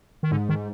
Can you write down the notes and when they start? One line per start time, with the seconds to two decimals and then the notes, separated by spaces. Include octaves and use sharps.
0.23 D#3
0.31 G#2 D3
0.49 D#3